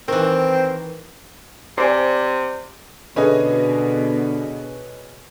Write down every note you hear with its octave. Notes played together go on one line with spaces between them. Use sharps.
D#3 E3 C4 A#4
C3 C5 D5 G#5
B2 D3 C#4 G#4 A4 B4 D#5